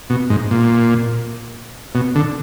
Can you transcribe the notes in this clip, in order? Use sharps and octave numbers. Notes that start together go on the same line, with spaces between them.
B2
G#2
A#2
B2
D3